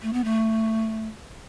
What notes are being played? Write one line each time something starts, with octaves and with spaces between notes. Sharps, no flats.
A3
B3
A3